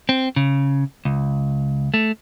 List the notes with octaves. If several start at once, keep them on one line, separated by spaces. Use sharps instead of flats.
C4
C#3
C#2
A3